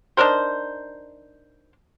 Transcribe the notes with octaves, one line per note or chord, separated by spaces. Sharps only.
D4 D#4 A#4 C5